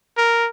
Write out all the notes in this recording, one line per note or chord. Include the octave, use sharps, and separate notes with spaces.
A#4